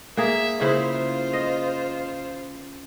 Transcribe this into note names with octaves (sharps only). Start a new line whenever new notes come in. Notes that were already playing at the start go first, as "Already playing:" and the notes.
A#3 G#4 E5
C#3 E4 F4 C5
D#5